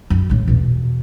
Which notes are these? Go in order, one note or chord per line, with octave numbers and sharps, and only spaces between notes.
F#2
A2 E3
E2 B2